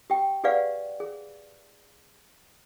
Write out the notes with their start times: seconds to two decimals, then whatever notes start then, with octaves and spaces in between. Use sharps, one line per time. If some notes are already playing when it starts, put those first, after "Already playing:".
0.10 G4 G5
0.44 G4 G#4 B4 D5 F5 F#5
1.00 G#4